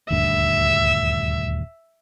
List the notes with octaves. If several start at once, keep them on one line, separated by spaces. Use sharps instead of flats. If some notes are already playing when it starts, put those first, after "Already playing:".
D#1 D2 G2 E5